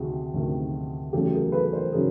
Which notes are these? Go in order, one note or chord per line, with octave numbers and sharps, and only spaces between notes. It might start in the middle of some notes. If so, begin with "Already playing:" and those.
Already playing: D2 C3 D#3 F#4 G#4
D2 C3 D#3
E2 C#3 F#3 A3 G4 A4
G#4 A#4
A4 B4
A#4 C5
C#3 F#3 G#4 A#4